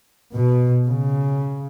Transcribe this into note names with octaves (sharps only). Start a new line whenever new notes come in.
B2
C#3